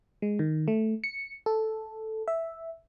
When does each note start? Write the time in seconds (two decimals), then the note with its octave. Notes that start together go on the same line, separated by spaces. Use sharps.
0.22 G#3
0.39 D#3
0.68 A3
1.04 C#7
1.46 A4
2.28 E5